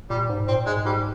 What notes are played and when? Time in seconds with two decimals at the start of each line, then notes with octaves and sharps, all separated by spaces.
0.10 A#2 G3
0.29 G#2
0.47 A#2 C4
0.66 G#2 G#3
0.85 G#2 G3